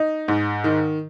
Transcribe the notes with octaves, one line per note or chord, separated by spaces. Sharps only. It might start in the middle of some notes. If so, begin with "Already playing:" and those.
Already playing: D#4
G#2
D#3